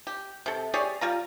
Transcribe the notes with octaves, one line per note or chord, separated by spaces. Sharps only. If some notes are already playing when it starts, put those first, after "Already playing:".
G4
C3 A4
G4 G#4 C#5 D5
G3 F4 A#5